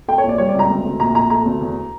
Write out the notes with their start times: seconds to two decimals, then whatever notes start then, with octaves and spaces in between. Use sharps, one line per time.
0.08 A3 G5
0.18 C#5
0.23 A#1
0.29 D5
0.38 G3 C#5
0.49 D5
0.54 C#2
0.59 A#5
0.70 D2
0.84 D2
1.00 A#1 A#5
1.15 A#1 A#5
1.30 A3 A#5
1.46 D2
1.61 E2